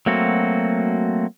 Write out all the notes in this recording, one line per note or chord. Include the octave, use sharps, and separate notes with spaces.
F#3 A3 A#3 C4 F#4